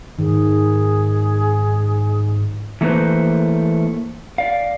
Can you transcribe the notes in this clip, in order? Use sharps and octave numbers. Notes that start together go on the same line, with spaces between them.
G#2 D#3 G#4
E3 A3 A#3 G#4 B4 C5
D5 F5